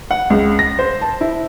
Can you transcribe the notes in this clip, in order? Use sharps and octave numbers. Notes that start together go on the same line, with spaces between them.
F#5
C#2
A#6
C5
A5
E4